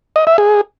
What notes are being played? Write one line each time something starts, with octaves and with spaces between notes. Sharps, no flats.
D#5
E5
G#4